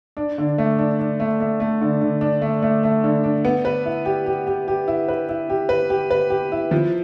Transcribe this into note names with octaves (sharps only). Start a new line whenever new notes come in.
D4
D3
A3
D4
D4
A3
A3
A3
D3
D3
D4
A3
A3
A3
D3
D4
B3
B4
E4
G4
G4
G4
G4
E4
B4
E4
G4
B4
G4
B4
G4
E4
F3